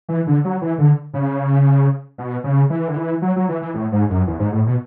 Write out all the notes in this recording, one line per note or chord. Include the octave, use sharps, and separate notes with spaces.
E3
D3
F#3
E3
D3
C#3
B2
C#3
E3
D3
E3
F#3
F#3
E3
E3
A2
G#2
F#2
E2
G#2
A2
B2